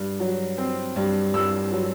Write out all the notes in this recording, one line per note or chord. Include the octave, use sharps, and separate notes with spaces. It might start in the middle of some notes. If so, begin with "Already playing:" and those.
Already playing: G2
F#3
C4
G2
G2 E6
F#3